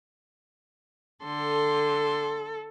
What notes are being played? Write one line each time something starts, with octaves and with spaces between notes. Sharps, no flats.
D3 A4 C6